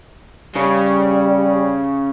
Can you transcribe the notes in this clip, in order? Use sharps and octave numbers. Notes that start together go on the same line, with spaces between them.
C#3 G3